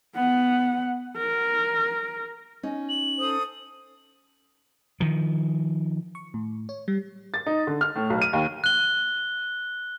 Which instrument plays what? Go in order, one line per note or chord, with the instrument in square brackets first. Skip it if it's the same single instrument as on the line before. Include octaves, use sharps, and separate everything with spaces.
[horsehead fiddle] B3 F#5
A#4
[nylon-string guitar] C#4 D#4 D#5
[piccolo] F#7
[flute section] A4 C5 D#6
[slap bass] D#3 F3
[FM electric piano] C#6
A2
C#5
G3
[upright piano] A6
D#4
D3
F6
A2
B1
D#7
D#2
[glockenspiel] F#6 G7